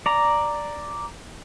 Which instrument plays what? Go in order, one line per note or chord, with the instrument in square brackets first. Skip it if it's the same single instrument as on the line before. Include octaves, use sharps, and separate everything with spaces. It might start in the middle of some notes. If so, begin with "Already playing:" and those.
[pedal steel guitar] D5 A#5